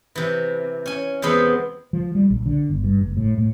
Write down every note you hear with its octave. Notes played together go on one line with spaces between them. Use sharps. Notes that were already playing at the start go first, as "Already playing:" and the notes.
C3 E3
C#4 G#5
E2 C3 G#3 B3 C4 B5
F3
G3
A#1
D3
G1
G2
F#1
A2
A2